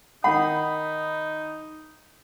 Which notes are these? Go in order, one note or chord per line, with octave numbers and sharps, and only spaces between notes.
D#3 D#4 F#5 B5